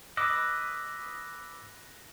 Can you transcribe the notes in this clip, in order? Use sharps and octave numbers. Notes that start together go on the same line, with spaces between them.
B4 D#5 D6 E6 F#6